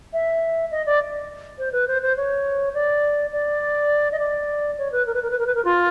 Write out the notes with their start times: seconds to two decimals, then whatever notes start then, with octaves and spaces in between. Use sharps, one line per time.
0.13 E5
0.71 D#5
0.86 D5
1.59 C5
1.72 B4
1.88 C5
2.02 C5
2.17 C#5
2.74 D5
3.32 D5
4.12 D#5
4.19 D5
4.78 C#5
4.92 B4
5.06 A#4
5.14 B4
5.22 A#4
5.31 B4
5.39 A#4
5.46 B4
5.55 A#4
5.65 F4